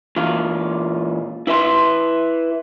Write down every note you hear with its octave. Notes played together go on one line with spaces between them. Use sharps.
A#2 E3 F5
E4 B4 E5 C6